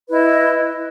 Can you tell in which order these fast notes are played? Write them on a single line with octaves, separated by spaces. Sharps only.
B4 E4 D#5